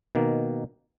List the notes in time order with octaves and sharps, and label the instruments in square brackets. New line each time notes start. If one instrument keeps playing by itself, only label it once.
[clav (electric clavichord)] B2 D#3 A#3